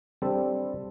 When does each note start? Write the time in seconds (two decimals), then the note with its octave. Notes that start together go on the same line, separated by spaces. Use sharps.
0.22 G3 C4 D4 A4